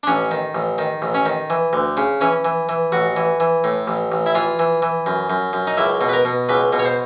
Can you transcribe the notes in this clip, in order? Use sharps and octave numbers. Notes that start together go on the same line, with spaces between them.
D4
A1 C#4
D#3
A1
D#3
A1
C#4
D#3
E3
D2
C#3
E3 C#4
E3
E3
A1 F#4
E3
E3
A2
A1
A1
E4
E3 F4
E3
E3
F#2
F#2
F#2
D#4
C#2 E4
B2
B4
A#4
B2
C#2 B4
B2
C#5
C5